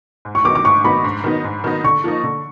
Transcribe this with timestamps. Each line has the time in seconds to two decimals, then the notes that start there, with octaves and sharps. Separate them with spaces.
0.25 G#2
0.35 C#6
0.45 D#3 F#3 B3 D#4 D6
0.55 D6
0.65 G#2 C#6
0.84 D#3 F#3 B3 D#4 B5
1.04 G#2
1.24 D#3 F#3 B3 D#4
1.44 G#2
1.64 D#3 F#3 B3 D#4
1.84 D3 C#6
2.04 F3 A#3 D#4
2.24 D3